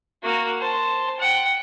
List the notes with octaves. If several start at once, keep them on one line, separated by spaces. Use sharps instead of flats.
A#3 F#4
C5 A5
F#5 G5